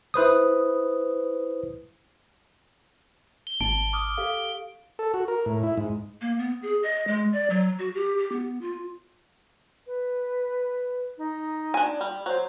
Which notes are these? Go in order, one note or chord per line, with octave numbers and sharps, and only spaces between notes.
E4 B4 C5 D#6
G7
G#1 A5 D7 G7
D6 D#6 F6
G4 A4 F5
A4
F#4
A#4
A2
E4
G#2
A#3
B3
G#4
D#5
G#3
D5
F#3
F#4
G4
G4
B3
F4
B4
D#4
D4 G#5
G3
F#3 C5